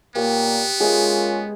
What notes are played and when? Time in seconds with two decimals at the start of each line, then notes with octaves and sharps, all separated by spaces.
0.15 A#2 A#3 B3 G4 C#5
0.80 G#3 A#3 C#4 F4 G#4 B4 E5